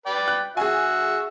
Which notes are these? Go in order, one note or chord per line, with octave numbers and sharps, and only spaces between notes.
B4 D5 G5
F#6
F#4 G#4 E5 G#5